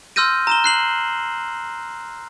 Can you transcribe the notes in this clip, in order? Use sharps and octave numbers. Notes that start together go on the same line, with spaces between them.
C6 E6 F6 G6 A#6 D#7
A#5 E7 G7
F#6 C7 F#7